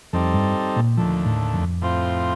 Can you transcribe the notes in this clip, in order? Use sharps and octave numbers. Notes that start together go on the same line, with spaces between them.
F2 G3 C4 D#4 A4
G2
A#2
D#2 D3 F3 A3
A2
F2
A2 F3 C4 F4